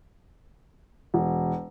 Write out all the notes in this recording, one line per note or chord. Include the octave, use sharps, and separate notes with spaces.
E1